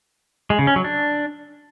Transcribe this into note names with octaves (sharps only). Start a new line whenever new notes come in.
G#3
C#3
C#4
F#3
D4